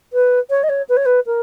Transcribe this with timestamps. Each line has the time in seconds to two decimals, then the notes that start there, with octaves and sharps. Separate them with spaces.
0.13 B4
0.50 C#5
0.63 D#5
0.69 C#5
0.89 B4
0.97 C#5
1.06 B4
1.26 A#4